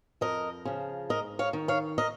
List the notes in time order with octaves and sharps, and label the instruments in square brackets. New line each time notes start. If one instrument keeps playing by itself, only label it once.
[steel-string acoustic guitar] F2 A#4 D#5
C#3 F3
G#2 A#4 D#5
C#5 F5
D#3
C#5 F5
A#4 D#5